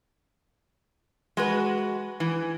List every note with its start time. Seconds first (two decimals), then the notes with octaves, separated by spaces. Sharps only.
1.37 G#3 F#4 B4
2.20 E3